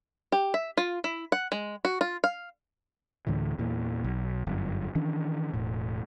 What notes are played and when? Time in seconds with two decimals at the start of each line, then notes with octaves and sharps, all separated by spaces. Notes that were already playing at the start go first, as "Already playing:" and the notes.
0.32 G4
0.54 E5
0.77 F4
1.04 E4
1.32 F#5
1.52 G#3
1.85 F#4
2.01 F4
2.24 F5
3.27 D2 A2 D3 E3
3.58 E2 A#2 E3
4.04 B1
4.47 G1 F#2
4.95 D#3 E3 C#4 D4
5.54 E1 A2